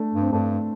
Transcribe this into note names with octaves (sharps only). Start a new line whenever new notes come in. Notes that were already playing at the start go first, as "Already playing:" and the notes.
Already playing: A3 D4
G2
C4
G2 A3 D4